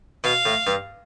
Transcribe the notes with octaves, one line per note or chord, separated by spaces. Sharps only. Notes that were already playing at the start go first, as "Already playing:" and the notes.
B2 F5
A2
G2